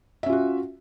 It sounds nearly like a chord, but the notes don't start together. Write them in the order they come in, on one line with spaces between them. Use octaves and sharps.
E5 C#4 F4 F#4